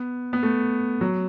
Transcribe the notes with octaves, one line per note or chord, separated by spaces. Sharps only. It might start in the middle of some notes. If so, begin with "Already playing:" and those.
Already playing: B3
B3
A3
F#3